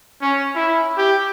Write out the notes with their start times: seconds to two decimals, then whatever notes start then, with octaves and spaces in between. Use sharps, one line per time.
0.22 C#4
0.54 E4
0.96 G4